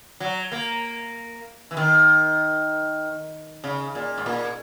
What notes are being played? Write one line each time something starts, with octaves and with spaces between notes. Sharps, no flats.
F#3
A#3
E3
D#3
C#3
A#2
G#2
A#2